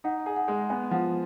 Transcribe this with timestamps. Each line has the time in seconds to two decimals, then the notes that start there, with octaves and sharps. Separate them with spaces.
0.04 D#4 F#5
0.26 G#4
0.36 F#5
0.48 G#3
0.69 B3 G#5
0.91 F3 F#5